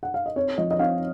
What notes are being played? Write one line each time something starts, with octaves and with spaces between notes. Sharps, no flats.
F#5
F5
D#5
C4 C#5
F3 D#5
D#5
C4 F5